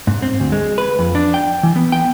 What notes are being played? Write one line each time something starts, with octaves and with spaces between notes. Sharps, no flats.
G#2
C4
D2
G#3
B4
F2
D4
G5
E3
B3
G5